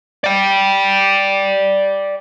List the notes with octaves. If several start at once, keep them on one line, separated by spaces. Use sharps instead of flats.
D5 G5